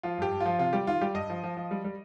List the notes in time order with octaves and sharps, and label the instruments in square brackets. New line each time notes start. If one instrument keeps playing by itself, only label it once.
[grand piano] F3 F4
G2 G4
G2
F3 F4
C3 F4
G3 G4
D#3 F4
G3 G4
G2 D#5
F3
F3
F3
G3
G3